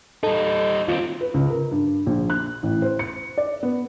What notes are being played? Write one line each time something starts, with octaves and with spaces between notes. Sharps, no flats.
G3 D#4 A4
D#2 C4 F4
B4
C#2
A#4
G2
A#1
F#6
A1
C5
C#7
D5
B3